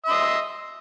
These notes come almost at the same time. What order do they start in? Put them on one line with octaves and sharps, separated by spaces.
E5 C6 D#5